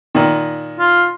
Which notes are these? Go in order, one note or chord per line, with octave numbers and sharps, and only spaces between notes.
A#2 D#3
F4